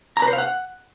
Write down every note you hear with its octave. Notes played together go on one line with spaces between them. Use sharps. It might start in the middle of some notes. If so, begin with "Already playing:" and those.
A#5
B4
C5
F5
F#5